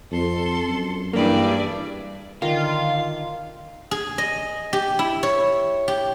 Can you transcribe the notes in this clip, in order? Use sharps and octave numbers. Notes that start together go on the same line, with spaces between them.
F2 A4 C6
F#2
G2 E3 A#3 G#4 D5 E5
D3 D#3 F4 F5
G#4
D#5
G4
E4
C#5
G4